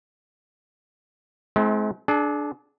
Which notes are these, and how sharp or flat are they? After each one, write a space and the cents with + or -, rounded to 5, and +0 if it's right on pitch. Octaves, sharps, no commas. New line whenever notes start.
G#3 +40 C4 +0 E4 -35
D4 +0 G#4 +40